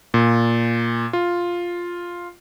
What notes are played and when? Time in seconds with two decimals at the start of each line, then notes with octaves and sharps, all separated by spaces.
0.14 A#2
1.13 F4